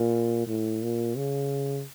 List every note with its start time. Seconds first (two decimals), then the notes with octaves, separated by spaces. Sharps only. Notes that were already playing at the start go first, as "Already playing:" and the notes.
Already playing: A#2
0.47 A2
0.82 A#2
1.17 C#3